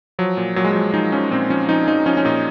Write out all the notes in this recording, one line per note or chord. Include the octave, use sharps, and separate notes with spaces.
F3 F#3
A#2
A#2 F#3
G#3
F3 F#3
F3 D#4
F3 C#4
A#2 C4
F3 C#4
F3 D#4
F3 D#4
F3 C#4
C#4
A#2 D#4